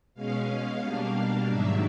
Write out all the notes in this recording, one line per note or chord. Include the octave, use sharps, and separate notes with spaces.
B2 G#3 C#4 F5
B2 G3 A#3 D4
G#2 D#3 F#3 A#3 D4 E5